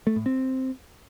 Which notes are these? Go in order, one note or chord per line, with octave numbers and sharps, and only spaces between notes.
A3
A2
C4